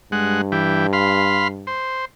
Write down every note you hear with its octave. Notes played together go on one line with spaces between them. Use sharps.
G2 G#3 F#5
E3 G4
F5 B5 C6
C5